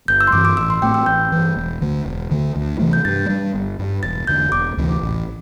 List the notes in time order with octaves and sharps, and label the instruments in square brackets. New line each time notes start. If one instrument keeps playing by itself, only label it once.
[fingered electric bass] G1 [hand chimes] G6
[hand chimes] E6
C6
[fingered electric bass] G2 E3 C4 [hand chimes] D6
[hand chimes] D6
[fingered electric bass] A1 [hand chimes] E6
[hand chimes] C6
[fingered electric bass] A2 A3 C4 [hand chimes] G5
[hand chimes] E6
[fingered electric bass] A1 [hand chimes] G6
[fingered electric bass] G2 E3
E1
D2 D3 A3
E1
D2 D3 A3
D2
C3 E3 A3
[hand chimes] G6
[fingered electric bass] G2 [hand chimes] A6
[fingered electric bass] G3 D4
G1
G2 G3
[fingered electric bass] E1 [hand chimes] A6
[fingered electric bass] E2 D3 [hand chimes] G6
[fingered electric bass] E1 [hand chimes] D6
[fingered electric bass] D2 C3 E3
A1